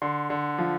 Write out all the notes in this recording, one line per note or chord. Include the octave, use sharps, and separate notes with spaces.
D3 C6
D3
F3